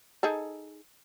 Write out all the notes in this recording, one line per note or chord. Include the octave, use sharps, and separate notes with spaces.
D#4 G#4 A4